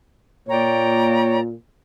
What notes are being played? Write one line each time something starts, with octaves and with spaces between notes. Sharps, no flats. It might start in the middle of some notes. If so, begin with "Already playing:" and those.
A#2 A#3 C#5 D5 G5 A#5